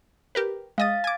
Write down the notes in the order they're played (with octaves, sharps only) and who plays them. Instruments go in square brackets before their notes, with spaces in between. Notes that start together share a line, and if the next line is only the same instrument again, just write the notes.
[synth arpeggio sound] G4 A#4 B4
[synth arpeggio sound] G#3 D#5 D#6 [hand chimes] F5 A6
[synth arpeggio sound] G#5 D6